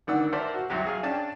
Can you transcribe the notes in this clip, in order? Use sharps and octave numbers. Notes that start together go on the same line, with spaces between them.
D2 D#3 D5 F#5 E6
A#4 C5 D5 E5 A5
F#4
C2 C3 F#3 G4
G#4 F5
C#4 D4 G5 A5